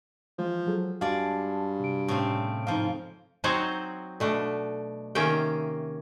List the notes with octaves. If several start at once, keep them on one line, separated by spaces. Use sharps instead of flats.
E3 F3 G#3
F#3 G#4 A4
G2 G#3 F#4 D5 F5 A5
C3 D7
A2 C#3 C4
G#2 F3 D#4 F5
F#3 C4 D#4 F#4 C5 C#5
B2 A3 D4
C3 D#3 A#3 C#4 E5 G5